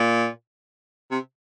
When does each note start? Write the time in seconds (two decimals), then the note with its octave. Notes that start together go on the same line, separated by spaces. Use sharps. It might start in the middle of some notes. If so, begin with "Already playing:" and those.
Already playing: A#2
1.11 C3